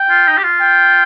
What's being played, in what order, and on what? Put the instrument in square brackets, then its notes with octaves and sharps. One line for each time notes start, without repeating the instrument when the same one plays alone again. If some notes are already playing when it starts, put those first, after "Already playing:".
Already playing: [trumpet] G5
[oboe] F4
D#4
G4
F4
[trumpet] G5